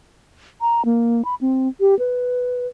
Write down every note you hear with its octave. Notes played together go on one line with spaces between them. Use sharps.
A#5
A#3
B5
C4
G4
B4